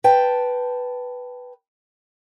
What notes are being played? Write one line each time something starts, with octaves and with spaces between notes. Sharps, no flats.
B4 G5 A5